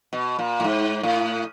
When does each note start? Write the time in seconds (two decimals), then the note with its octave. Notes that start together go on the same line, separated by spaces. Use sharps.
0.13 B2
0.39 A#2
0.60 A2
0.64 G#2
1.03 A2